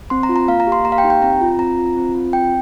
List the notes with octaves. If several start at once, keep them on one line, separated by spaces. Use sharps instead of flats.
C4 C6
A#5
F4
A#5
A#3 F5
A#5
G4 C6
A#3 A#5
F5
G5
D#4 G4
G5
C4 A#5
F4
C4 A#5
F4
C4
F4
C4 G5